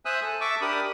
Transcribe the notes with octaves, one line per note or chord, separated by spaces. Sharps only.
C5 E5 G#5 D#6 E6 F#6
A4
E5 A5 C#6 D6 E6
D4 G4 A#4 B5 D#6